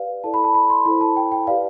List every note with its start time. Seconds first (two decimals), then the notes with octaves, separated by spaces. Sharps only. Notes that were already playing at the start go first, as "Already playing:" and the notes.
Already playing: G4 B4 D5 F5
0.24 E4 A4 D5 A5
0.34 B5
0.44 A5
0.55 B5
0.70 C6
0.85 E4 A4 C5 B5
1.01 A5
1.16 G5
1.32 G5
1.47 G4 B4 D5 F5